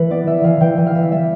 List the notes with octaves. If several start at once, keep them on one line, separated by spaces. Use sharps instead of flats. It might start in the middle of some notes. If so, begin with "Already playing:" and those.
Already playing: E3 B4
B3 D5
E3 E5
E3 F5
E3 G5
E3
F5
E3 E5
G3 E5